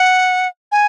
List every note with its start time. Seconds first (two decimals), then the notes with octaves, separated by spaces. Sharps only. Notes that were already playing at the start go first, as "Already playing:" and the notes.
Already playing: F#5
0.72 G#5